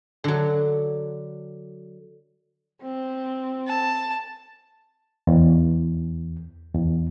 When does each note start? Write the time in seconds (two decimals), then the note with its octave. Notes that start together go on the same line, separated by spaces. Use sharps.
0.24 D3 F#3
2.82 C4
3.67 A5
5.27 E2
6.75 E2